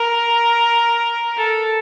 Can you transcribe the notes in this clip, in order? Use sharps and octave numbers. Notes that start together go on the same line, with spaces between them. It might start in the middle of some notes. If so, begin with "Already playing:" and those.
Already playing: A#4
A4